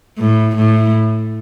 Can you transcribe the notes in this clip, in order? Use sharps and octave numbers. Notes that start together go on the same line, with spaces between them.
A2
A2